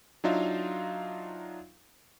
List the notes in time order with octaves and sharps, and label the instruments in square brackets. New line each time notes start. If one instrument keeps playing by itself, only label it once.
[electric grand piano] F#3 D4 D#4 F4 E5 F5